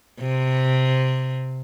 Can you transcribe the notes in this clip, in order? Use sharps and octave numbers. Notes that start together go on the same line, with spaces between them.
C3